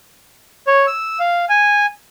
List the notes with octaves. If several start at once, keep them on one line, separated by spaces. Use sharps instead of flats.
C#5
E6
F5
G#5